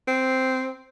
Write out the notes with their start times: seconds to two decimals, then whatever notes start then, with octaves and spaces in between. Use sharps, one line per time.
0.08 C4